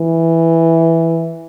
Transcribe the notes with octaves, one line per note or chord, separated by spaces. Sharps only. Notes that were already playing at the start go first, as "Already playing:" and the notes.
Already playing: E3